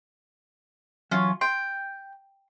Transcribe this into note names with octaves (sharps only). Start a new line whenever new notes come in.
E3 F#3 C#4 F4
G5 C6